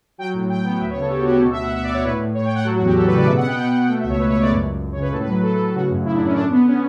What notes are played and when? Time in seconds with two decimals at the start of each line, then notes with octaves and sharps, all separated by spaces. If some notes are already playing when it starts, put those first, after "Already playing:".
0.18 F#3 G5
0.33 A2
0.49 A2 G5
0.64 B3
0.80 D2 E5
0.90 C#5
0.95 C#3
1.00 A4
1.10 D2 G4
1.21 F#4
1.26 D2
1.31 G4
1.41 B2 A4
1.51 E5
1.57 B2 F#5
1.73 B2 E5
1.83 D5
1.88 B2
1.93 C#5
2.03 A2 B4
2.19 A2
2.34 A2 C#5
2.45 G5
2.50 A2
2.55 F#5
2.64 F#3 A4
2.75 F#4
2.80 E2
2.86 G4
2.95 E2 A4
3.06 B4
3.11 C#3
3.17 D5
3.26 B2 E5
3.37 F#5
3.43 B3 G5
3.58 B2 G5
3.73 B2
3.88 A3 G5
3.99 E5
4.04 C#2
4.09 C#5
4.19 C#2 B4
4.30 C#5
4.35 C#2
4.40 D5
4.51 F#2
4.66 F#2
4.81 F#2
4.92 C#5
4.96 C#3
5.01 B4
5.12 A2 A4
5.22 B4
5.27 F#3
5.43 F#3 A4
5.58 A2
5.74 C#3 F#4
5.90 F#2
6.05 C#3 E4
6.15 D4
6.20 F#2
6.25 C#4
6.35 D3 D4
6.50 B3
6.67 C#4